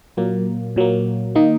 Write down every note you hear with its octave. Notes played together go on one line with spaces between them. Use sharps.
A#2 F#3 A#3
A#2 F#3 A#3
D#3 A#3 D#4